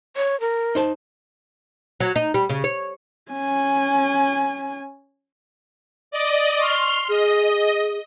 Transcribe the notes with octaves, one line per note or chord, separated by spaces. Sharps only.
C#5
A#4
D#4 C5 A5
F#3
D#4
G3
C#3
C#5
C#4 G#5
D5 D#5
C6 C#6 F6 C7
G#4 D#5